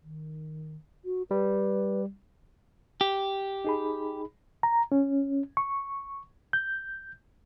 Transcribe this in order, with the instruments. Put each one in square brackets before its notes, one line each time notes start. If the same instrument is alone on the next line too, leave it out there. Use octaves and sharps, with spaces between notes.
[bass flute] D#3
F#4
[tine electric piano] G3 [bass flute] B4
[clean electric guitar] G4
[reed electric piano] D#4 G#4 B5
A#5
C#4
C#6
G6